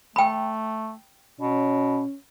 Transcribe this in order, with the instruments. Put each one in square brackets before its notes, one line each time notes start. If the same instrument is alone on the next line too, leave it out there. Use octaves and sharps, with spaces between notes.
[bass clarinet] A3 [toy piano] G5 B5
[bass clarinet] B2 [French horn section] C#4